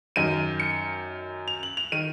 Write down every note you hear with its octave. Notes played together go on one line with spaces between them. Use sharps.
F#2 D#3 D#7
C#7
F7
F#7
F7
D#3 D#7